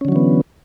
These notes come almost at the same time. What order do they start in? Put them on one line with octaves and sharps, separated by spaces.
C#4 D3 F#3 E3 B3